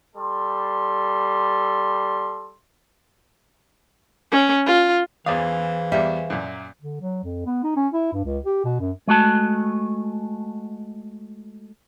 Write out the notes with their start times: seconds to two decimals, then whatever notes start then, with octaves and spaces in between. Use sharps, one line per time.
0.16 G3 A4 C6
4.32 C#4
4.66 F4
5.26 E2 E3 G#4 C5 D5 F5 D#6
5.92 E2 G3 E5
6.30 F#2 A#2
6.82 D3
7.01 F#3
7.23 F2
7.46 B3
7.64 D#4
7.76 C#4
7.93 E4
8.13 G2
8.25 C#2
8.46 G4
8.64 B2
8.80 F#2
9.08 G#3 A3 F#4 A5